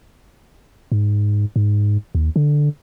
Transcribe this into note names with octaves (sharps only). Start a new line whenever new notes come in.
G#2
G#2
D#2
D3